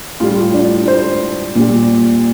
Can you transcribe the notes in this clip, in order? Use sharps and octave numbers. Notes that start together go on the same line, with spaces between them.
A2 G3 F4
D4
C5
A#2 G3